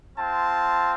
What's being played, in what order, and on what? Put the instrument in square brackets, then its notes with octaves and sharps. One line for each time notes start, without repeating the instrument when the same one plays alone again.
[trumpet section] C4 F4 A5